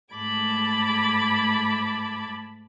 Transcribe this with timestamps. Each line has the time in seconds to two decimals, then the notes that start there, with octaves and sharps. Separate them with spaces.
0.15 G#2 A3 A5 B5 D6 G#6